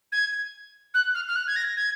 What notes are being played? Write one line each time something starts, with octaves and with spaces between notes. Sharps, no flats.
G#6
F#6
F6
F6
F#6
G#6
A#6
G#6